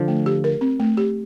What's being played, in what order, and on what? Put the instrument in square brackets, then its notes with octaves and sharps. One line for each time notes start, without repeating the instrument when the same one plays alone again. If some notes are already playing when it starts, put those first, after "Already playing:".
Already playing: [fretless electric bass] D3 F3
[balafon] A3
G4
A#4
C4
A3
G4